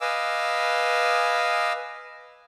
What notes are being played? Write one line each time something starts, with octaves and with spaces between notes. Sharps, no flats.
B4 D#5 F5 G#5 D6 E6